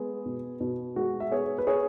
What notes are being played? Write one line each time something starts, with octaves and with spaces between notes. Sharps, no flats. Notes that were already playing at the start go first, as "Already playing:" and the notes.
Already playing: G#3 B3 G#4
B2
B2
G#3 F#4
E5
B3 G#4 C#5
B4
G#4 C#5